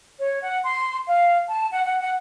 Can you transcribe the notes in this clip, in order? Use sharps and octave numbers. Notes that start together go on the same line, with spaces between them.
C#5
F#5
C6
F5
A5
F#5
F#5
F#5